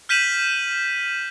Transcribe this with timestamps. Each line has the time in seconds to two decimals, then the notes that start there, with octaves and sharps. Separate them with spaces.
0.09 F6 G6 B6 D#7 E7 F#7